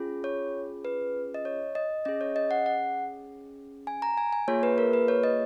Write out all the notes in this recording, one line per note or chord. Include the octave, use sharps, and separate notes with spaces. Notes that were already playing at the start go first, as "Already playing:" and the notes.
Already playing: C#4 F4 G#4
C#5
B4
D#5
C#5
D#5
C#4 G#4 D#5
C#5
D#5
F#5
F#5
G#5
A#5
G#5
G#5
A#3 F4 G#4 C#5
B4
A#4
B4
C#5
D#5